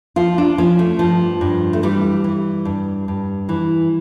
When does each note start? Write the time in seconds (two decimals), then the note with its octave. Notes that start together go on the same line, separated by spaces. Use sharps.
0.16 F3 F4
0.38 D4
0.58 F3 C#4
0.79 A3
0.99 G2 F3
1.41 G2
1.73 A3
1.83 E3 G3
2.24 E3
2.65 G2
3.08 G2
3.49 E3